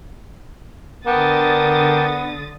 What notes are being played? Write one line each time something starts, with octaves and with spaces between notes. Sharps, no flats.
D3 B3 A#4 G5 A5 D6 D#6 A6